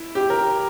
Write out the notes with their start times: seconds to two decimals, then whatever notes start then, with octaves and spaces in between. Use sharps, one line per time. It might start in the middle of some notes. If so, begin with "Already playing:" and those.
Already playing: E4
0.15 G4
0.30 A#4